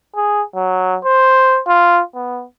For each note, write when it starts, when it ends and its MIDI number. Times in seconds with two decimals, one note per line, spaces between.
0.15 0.42 68
0.55 0.96 54
1.04 1.59 72
1.67 2.01 65
2.15 2.43 59